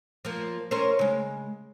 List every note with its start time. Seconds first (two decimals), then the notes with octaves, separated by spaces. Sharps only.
0.25 F3 A#3
0.71 C#4 A#4 C5
0.99 C#3 G#3